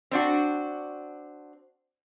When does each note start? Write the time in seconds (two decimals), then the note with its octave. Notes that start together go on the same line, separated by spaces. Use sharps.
0.11 C4 D4 F#4